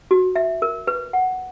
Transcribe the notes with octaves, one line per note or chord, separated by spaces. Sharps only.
F#4
E5
A#4
B4
F#5